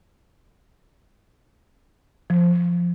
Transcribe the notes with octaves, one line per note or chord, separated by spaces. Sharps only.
F3